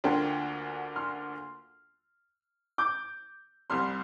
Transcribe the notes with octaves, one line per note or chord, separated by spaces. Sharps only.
D2 D3 A#3 D4 F4 G5 C6
C6 F6
D6 G6
C2 C3 G3 C6 F6